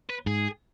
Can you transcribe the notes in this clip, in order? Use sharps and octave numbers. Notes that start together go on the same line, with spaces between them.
B4
G#2 G#4